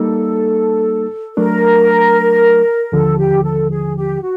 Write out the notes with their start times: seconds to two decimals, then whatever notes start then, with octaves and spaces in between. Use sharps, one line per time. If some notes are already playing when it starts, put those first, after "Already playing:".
Already playing: G3 A#3 D#4 A4
1.37 F#3 A3 D4 A#4
2.92 D#2 D3 F3 A4
3.18 G4
3.44 A4
3.70 G#4
3.96 G4
4.22 F#4